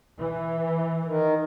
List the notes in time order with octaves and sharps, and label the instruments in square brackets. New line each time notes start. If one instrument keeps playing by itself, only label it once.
[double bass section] E3
[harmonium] D#3